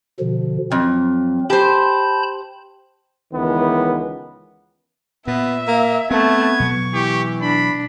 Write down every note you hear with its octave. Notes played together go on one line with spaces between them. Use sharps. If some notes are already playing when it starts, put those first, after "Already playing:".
B2 D3 F3
F2 F#3 C4
G4 C5 A5 B5 G6
C#2 D#3 E3 B3
A#2 B3 E5
A#3
A3 B3 C4 A5 G#6
B2 F#3 C#6
E3 G4
D4 B5